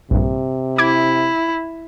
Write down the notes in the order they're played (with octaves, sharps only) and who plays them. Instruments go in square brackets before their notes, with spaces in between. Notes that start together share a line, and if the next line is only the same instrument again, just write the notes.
[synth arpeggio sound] A#1 G2 [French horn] C3
[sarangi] E4 [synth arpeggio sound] D6 G#6